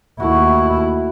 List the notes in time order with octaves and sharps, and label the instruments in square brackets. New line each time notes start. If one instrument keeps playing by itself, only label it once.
[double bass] D#2 E4 [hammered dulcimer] A3 F#4